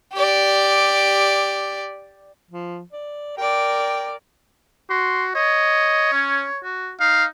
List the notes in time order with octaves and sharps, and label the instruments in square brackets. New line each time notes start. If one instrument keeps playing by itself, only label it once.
[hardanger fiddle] G4 D5
[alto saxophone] F3
D5
[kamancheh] A#4 D5 [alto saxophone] G5
[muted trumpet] F#4 [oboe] C6
[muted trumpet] C#5 [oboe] D#5
[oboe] C#4
F#4
[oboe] D#4 [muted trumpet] F5